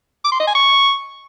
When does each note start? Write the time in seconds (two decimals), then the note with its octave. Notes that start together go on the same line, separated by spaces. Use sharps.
0.24 D6
0.32 C6
0.40 D#5
0.47 G#5
0.55 C#6